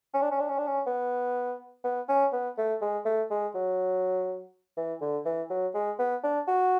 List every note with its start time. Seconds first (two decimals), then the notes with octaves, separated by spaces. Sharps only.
0.14 C#4
0.22 D4
0.32 C#4
0.40 D4
0.49 C#4
0.59 D4
0.67 C#4
0.87 B3
1.84 B3
2.09 C#4
2.33 B3
2.58 A3
2.82 G#3
3.06 A3
3.31 G#3
3.55 F#3
4.77 E3
5.01 D3
5.26 E3
5.50 F#3
5.75 G#3
5.99 B3
6.23 D4
6.48 F#4